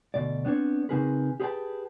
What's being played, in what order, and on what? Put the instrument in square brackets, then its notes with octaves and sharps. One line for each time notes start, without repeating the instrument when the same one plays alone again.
[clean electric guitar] D2 B2 D5
B3 C4 D4 C#5
C#3 C4 D#4 G#4 A#4 B4
G4 G#4 B4 C5 G5 A5